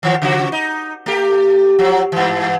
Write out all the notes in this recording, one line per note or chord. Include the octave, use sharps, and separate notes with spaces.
D#3 F3
C#3 F3 F#4
D#4
A3 G4
F3 F#3
G2 E3